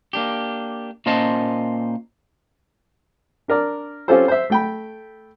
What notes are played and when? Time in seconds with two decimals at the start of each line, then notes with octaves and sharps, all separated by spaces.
0.13 A#3 D4 G4
1.06 A#2 A#3 C#4 C5 D#5 A5
3.48 D4 A#4 D5
4.08 C4 C#4 F4 G4 A4 C5
4.28 C5 E5
4.50 A3 G5 B5